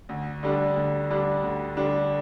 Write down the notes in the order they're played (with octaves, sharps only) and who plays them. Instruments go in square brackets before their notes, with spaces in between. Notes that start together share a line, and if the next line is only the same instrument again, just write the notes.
[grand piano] D2
D3 G3 D4
D2
D3 G3 D4
D2
D3 G3 D4